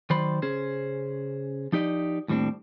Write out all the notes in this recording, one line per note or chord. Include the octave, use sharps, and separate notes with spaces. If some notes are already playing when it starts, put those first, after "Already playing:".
D#3 F#3 C5 D5 B5 C6
C#3 C#4 G#4 C5
F3 D#4 G4 D5 D#5
D#2 A2 G3 C4 D4